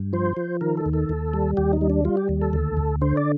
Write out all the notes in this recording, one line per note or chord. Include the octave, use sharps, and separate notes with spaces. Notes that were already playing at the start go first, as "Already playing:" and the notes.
Already playing: G2
F3 C5
F3
D#3 A#4
A4
D#2
A4
D#2
G3
D#2 G4
D#4
G3
D4
G3 F4
G4
D#2
A4
D2
D2
D3 C5
D5